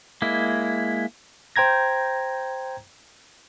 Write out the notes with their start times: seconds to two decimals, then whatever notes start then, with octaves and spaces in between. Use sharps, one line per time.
0.22 G#3 A#3 E4
1.56 C5 G5 A#5 G#6 A#6